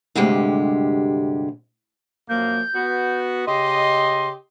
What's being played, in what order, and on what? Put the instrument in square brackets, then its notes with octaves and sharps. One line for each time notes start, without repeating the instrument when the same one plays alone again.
[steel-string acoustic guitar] D2 G2 C3 G#3 G4
[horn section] F#2 F3 A#3 [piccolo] G6
[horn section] B3 F#4
[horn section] C#3 G4 D#5 [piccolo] C6